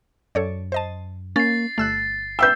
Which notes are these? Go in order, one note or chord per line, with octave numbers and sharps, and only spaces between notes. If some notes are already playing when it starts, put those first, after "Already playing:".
F#2 A4 C#5 D5
C5 D#5 A5
A#3 C#4 A6 C7
G1 A3 E6 F#6
B4 E5 G5 E6 G6